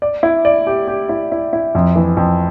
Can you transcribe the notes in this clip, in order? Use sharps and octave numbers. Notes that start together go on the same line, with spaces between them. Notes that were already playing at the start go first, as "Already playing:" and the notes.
D5
E4
D5
G4
G4
E4
E4
E4
F2
E3
F2